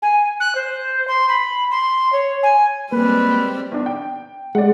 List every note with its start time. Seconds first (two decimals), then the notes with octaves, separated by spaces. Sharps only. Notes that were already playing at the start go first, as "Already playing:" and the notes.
0.02 G#5
0.40 F#6
0.55 C5
1.07 C6
1.28 B5
1.71 C6
2.12 C#5
2.43 G#5
2.92 G3 G#3 A#3 C4 B4
3.72 E2 D4
3.86 G5
4.55 G#3 D5 F#5